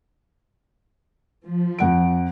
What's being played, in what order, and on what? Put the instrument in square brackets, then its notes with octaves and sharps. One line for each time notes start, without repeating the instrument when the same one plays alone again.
[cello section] F3
[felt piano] F2 F#5 D7